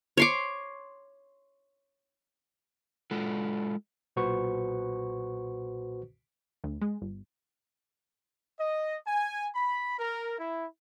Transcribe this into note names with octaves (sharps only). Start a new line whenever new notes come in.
C#5 C6 D6
G#3 F4 F#4 A4
B1 A#2 F#4 B4 C5 C#6
D2
G#3
G1
D#5
G#5
B5
A#4
E4